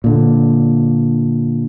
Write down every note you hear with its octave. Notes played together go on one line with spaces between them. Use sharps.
A#2 D3